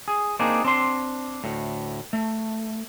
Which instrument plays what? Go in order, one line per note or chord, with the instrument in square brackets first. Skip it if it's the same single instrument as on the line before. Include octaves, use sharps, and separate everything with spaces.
[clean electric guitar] G#4
A#3 C4 D4 D#4 G#4
C4 D4 C6
D2 A2
A3